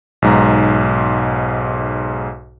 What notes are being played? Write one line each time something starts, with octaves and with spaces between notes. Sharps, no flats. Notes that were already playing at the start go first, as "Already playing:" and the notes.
B1 G#2 A#5